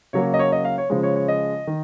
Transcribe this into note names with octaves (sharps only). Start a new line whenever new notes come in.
C#3 F#3 A#3 C#5
D#5
C#5
D#5
F5
C#5
C#3 F3 G#3
C#5
C#5
D#5
D#3